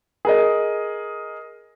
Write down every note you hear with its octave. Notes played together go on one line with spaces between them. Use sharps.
G#4 A#4 D#5